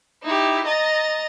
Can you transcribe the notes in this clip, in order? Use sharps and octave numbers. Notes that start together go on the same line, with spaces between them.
D#4 E4 G4
D#5 A#5 A6